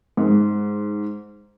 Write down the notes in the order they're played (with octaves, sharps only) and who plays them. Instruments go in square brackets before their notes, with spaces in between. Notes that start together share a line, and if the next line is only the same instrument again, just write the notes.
[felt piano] G#2